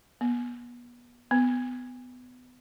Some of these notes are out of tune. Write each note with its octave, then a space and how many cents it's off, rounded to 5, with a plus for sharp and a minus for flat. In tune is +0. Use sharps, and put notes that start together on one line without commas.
B3 -35
B3 +20